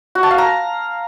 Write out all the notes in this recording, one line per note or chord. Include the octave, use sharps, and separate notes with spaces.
F#4
A5
F5
A#5